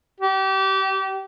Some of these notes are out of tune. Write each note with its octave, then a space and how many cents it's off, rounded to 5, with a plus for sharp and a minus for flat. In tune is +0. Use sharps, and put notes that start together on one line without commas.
G4 -30